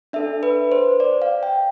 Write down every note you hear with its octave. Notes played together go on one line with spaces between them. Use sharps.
D4 A4 E5
B4
C5
D5
F5
G5